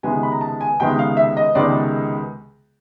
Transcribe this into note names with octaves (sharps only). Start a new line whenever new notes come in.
C#2 C3 D#3 G#3 B3 G#5
B5
A#5
A5
G#5
C#2 C3 D#3 G#3 B3 G5
F5
E5
D#5
C#2 C3 D#3 G#3 B3 D5